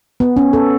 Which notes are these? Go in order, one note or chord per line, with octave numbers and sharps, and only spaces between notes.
B3
C#4
A4